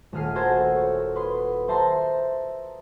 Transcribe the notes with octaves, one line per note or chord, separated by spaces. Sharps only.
D#1 A3 G#4 F6 C7 D#7
F#4 A4 A#4 C5 G#6
C#5
B4 C6 D#6
C5 E5 A5 A#5 C6